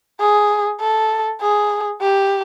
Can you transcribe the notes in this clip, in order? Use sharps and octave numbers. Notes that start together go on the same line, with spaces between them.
G#4
A4
G#4
G4